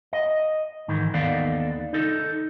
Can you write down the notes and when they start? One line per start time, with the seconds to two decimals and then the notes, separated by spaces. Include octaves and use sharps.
0.13 D#5
0.88 G#2 D#3 E3
1.14 D#2 D#3 B3 A4 D5 F5
1.93 D#4 A4